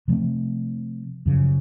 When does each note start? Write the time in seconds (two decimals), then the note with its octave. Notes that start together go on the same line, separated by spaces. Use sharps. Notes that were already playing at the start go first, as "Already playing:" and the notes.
0.08 C3 F3 A3 C4
1.26 F#2 C#3 F3